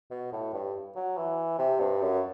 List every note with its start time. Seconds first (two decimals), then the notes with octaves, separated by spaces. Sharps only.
0.11 B2
0.32 A2
0.54 G2
0.96 F#3
1.17 E3
1.59 C3
1.80 G2
2.02 F#2